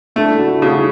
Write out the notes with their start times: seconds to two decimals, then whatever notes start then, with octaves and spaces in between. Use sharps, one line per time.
0.16 A3 D4 E4
0.39 E4 F#4
0.62 C#3 E4 F#4